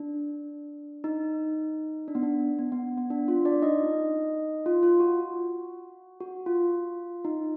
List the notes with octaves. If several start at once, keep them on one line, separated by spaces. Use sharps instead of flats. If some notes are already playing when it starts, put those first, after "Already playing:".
Already playing: D4
D#4
D4
B3
D4
B3
B3
B3
D4
F4
D4 D5
D#4 D#5
F4
F4
F#4
F#4
F4
D#4